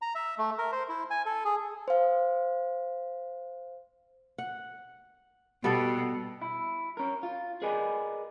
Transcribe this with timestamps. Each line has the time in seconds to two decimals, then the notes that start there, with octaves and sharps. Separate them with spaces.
0.02 A#5
0.15 E5
0.38 A3
0.58 A#4
0.72 C5
0.89 E4
1.11 G#5
1.26 A4
1.45 G#4
1.88 C5 F5
4.38 F#5
5.64 B2 G3 B3 A4
6.42 E4
6.97 C#4 A#4
7.23 F4
7.62 G#4 A#4 B4 D5 D#5 G#5